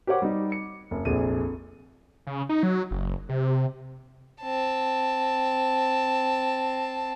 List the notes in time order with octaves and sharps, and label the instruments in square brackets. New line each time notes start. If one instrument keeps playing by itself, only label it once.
[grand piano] G4 A#4 C5 C#5 F#5 D6
G3 D#4
C#7
F#1
F1 A#1 G#4 D#7
[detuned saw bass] C#3
D#4
F#3
F#1
C3
[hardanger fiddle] C4 A5